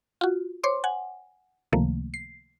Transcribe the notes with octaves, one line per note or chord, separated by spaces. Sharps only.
F4 F#4
C5 C#5 C6 D6
F#5 G#5
C#2 C3 D#3 F3 A3 A#3
C7